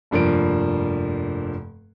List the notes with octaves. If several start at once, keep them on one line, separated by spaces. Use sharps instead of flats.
F1 G2 F3 A#3 D7